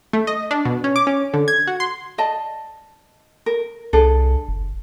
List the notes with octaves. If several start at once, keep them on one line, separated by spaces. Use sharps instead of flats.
A3
D#5
D4
B2
C#4
D6
C#4
D3
G#6
F#4
C6
D5 D#5 A5
A#4
C2 D4 G#4 A4
F#1